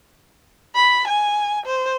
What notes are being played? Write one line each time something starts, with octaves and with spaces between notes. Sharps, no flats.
B5
G#5
C5